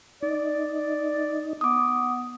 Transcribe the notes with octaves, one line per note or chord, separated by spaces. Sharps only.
D#4 D5
B3 D6 D#6